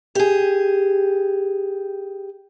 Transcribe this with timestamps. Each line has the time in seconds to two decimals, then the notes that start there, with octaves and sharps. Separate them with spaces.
0.15 G4 G#4